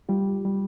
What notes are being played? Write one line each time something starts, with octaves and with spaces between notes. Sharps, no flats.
G3 F4 G4
G3